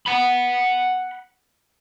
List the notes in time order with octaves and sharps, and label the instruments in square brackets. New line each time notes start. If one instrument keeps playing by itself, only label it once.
[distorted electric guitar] F#5 B5